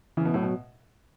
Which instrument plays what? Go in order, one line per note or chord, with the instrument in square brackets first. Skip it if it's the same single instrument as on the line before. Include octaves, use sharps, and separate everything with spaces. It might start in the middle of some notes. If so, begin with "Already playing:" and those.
[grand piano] C#3 [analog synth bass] E3
[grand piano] B2
[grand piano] A2 [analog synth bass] F#3
[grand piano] B2